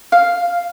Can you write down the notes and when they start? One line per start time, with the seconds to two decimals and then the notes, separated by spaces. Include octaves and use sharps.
0.12 F5